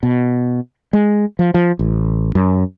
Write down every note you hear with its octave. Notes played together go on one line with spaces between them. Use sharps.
B2
G#3
F3
F3
A1
F#2